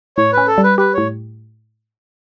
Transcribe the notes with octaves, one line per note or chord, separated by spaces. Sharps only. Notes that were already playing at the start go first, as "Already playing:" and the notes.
A2 C#5
C#4 B4
A4
G3
B4
G4 B4
A2 C#5